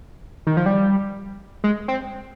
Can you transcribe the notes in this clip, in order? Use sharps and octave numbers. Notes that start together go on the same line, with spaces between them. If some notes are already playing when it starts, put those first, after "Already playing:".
D#3
F3
G3
G#3
C4